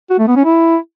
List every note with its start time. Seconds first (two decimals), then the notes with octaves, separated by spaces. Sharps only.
0.10 F#4
0.19 A3
0.27 B3
0.36 C#4
0.45 E4